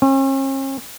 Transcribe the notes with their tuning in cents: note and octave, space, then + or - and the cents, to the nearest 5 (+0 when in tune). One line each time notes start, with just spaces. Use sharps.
C#4 -45